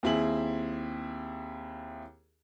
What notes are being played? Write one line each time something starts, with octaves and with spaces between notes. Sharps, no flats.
D#2 C4 E4 G#4 F#7